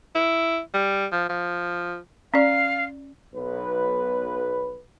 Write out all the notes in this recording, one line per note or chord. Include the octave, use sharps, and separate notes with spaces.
E4
G3
F3
F3
C#4 D5 F5
B1 B4